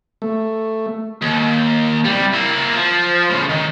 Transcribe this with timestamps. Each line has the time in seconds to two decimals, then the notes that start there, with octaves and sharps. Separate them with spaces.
0.22 A3
1.22 D#2
2.06 C2 G3
2.34 A#3 E4
2.76 F3
3.30 A2 C#3
3.49 D#3